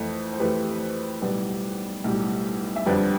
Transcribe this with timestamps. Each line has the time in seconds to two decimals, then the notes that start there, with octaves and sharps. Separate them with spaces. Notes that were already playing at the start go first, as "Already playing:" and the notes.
Already playing: F2 E3 A3
0.33 C5
0.39 F2 E3 A3 G4 B4
1.21 B1 A2 G3 B4 D5
2.04 B1 A2 G3
2.76 E5
2.86 F2 D3 G3 B4 D5